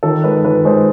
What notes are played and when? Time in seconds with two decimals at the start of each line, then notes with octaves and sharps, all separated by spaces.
0.03 D#3 A4
0.24 G#3 B4
0.45 D#3 B4
0.65 G#3 C5